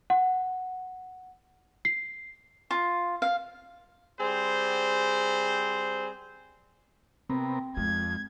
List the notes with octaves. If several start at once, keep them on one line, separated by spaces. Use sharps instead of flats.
F#5
C7
F4
F5
G3 C4 G#4 C5
C3 B3 C4 A#4
F2 G#3 G#6